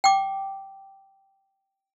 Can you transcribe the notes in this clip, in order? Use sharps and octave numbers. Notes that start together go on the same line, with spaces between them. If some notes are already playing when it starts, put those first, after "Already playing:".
G5 D6